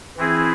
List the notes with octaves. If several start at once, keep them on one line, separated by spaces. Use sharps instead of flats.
E3 C4 E4 G#4